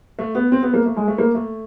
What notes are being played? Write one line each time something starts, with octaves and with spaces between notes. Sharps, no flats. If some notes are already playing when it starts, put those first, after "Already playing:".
A3
B3
C4
B3
A#3
A3
G#3
A3
A#3
A3